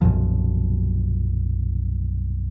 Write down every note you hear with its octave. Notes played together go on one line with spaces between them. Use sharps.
B1 F#2 A#2 F3